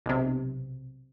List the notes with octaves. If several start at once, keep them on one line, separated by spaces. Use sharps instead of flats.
B1 C3